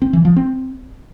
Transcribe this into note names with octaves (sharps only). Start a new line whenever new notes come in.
C4
E3
F3
C4